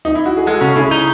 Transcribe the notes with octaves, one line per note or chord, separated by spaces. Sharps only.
D#4
E4
F#4
G#4
G#3 F#4 A4
C#3
C#3 E4 G#4
D#4